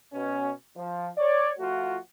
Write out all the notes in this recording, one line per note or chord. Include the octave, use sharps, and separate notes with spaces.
B2 C#4
F3
C#5 D5
F3 A3 F4 F#4